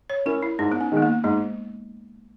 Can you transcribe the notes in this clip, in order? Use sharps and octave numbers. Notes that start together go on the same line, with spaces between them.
C#5
C#4 E4 A#4
E4
G#2 D#4
B3
C#4
D#3 G#3 B3
A#3
G#2 G#3